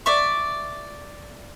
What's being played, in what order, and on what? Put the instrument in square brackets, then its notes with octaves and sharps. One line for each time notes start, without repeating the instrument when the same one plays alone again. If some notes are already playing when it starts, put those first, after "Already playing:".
[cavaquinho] D5 E5 C#6